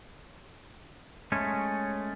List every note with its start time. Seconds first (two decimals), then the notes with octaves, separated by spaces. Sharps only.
1.32 G#3 A3 C#4